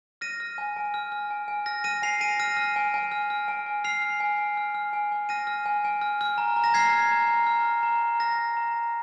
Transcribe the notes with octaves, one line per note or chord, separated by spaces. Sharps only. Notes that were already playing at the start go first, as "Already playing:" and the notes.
F6 A#6 D#7
F6
G#5
G#5
F6
F6
G#5
G#5
F6 A#6
F6 A#6 D#7
G#5 C7 F7
G#5 A#6 D#7
F6 A#6 D#7
F6
G#5
G#5
F6
F6
G#5
G#5
F6 C7 F7
F6
G#5
G#5
F6
F6
G#5
G#5
F6 A#6 D#7
F6
G#5
G#5
F6
F6
A#5
A#5
A#6
F6 G#6 C7
F6
A#5
A#5
F6
F6
A#5
A#5
F6 A#6
F6
A#5
A#5